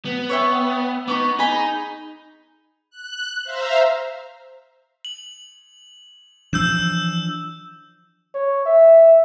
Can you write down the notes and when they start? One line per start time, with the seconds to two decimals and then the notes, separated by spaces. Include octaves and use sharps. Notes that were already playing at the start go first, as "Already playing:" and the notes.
0.05 B3
0.29 C#5 E5 G5
1.08 B3 D#4 C#6 D6
1.39 D#4 G#4 B5
2.90 F#6
3.44 C5 E5 F5 A#5
5.05 F#7
6.53 E3 F3 D4 E6 G6 E7
8.34 C#5
8.66 E5